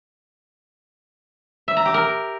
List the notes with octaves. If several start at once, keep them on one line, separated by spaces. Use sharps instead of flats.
E5
A#5
G4
A#4